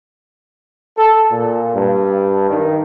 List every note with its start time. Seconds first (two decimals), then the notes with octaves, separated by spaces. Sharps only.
0.97 A4
1.31 A#2
1.74 G2
2.50 D#3